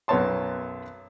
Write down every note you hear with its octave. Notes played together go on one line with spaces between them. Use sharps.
B1 F#2 B3 C#5 A5 C6